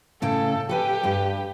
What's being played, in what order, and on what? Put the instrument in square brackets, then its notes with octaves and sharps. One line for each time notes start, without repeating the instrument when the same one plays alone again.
[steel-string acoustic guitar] A2 C#3 G5 [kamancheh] A4
[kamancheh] G4 [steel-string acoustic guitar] A4 B4 G#5
[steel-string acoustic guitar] G2 B4